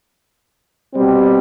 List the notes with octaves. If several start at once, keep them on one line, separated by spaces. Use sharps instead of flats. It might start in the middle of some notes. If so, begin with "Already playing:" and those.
B2 G3 C4